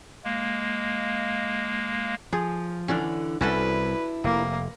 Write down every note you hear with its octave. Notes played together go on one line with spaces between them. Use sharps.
G#3 A#3
F3 G#4
D3 E3 C#4 D4
C2 C#4 D4 E4 F#4 A4 B4
F1 A#3